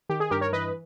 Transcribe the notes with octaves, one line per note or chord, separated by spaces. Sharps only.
D#3 G4
G#4
G2 G4 A#4
A#4 C#5
E3 B4 D#5